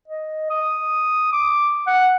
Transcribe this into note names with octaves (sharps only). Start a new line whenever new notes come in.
D#5
D#6
D6
F#5